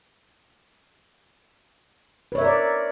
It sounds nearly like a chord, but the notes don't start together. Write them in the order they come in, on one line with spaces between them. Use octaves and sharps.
B4 C#5 E5 A#4 D5